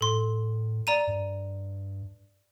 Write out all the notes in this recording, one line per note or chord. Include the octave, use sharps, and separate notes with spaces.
A2 A4 C6
D5 A#5 D#7
G2